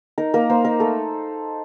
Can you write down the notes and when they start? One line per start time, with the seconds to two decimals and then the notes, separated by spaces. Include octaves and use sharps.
0.18 D#4 A#4
0.34 A#3 A#4
0.50 A#3 C5
0.65 D#4 A#4
0.80 A3 A4